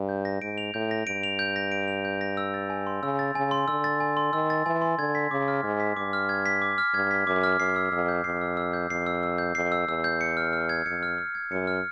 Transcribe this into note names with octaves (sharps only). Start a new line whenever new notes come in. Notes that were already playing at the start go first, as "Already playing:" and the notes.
Already playing: G2
G6
A#6
G#2 D7
F7
A2 G6
A#6
G2 D7
F7
G6
A#6
D7
F7
G6
A#6
E6
A6
G#5
C6
C#3 E6
A6
C#3 G#5
C6
D3 E6
A6
G#5
C6
D#3 E6
A6
E3 G#5
C6
D3 G#6
B6
C#3 D6
F6
G#2 G#6
B6
G2 D6
F6
G#6
B6
D6
F6
G2 G#6
B6
F#2 D6
F6
F#2 C7
E6
F2 E6
G6
F2 C7
E6
E6
G6
F2 C7
E6
E6
G6
F2 C7
E6
E2 E6
G6
C#7
F6
F6
G#6
F2 C#7
F6
F6
G#6
F#2 C#7
F6